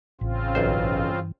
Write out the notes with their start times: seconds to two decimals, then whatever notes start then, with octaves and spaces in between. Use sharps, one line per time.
0.21 A1 C#3 C4 F4
0.55 B1 G2 E3 C5